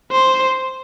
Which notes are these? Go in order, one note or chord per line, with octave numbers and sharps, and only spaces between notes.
C5